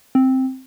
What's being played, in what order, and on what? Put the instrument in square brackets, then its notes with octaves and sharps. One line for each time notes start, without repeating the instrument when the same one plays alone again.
[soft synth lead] C4